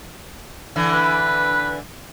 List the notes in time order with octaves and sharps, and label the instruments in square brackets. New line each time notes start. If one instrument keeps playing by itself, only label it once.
[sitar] D3 E3
[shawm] B4